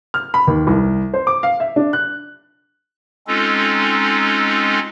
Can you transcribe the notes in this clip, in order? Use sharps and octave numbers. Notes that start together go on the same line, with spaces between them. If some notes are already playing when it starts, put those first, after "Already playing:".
F6
B5
D#2
C2
C5
D6
F5
E5
D4
F#6
G#3 C4 C#4 D#4 F4 A4